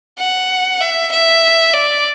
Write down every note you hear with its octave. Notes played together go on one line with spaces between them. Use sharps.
F#5
E5
E5
D5